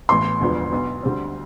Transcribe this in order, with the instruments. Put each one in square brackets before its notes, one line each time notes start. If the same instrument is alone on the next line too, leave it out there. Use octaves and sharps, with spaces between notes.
[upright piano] A1 A2 E3 B3 [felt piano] C6
[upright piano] E1 D2 D3 F3 B3
B1 B2 B3
D2 D3 G3 C4